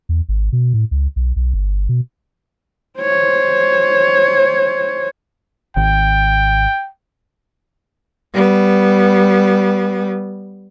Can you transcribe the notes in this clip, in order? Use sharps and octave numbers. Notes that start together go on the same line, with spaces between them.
E2
G#1
B2
A2
C#2
B1
B1
G1
B2
C5 C#5
G#1 G5
G3 B3